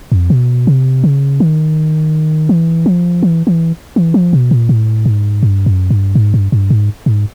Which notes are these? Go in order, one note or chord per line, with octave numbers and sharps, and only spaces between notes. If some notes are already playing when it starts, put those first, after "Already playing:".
F2
B2
C3
C#3
D#3
E3
F3
E3
E3
E3
F3
B2
A#2
A2
G#2
G2
F#2
G2
G#2
G2
G2
G#2
G#2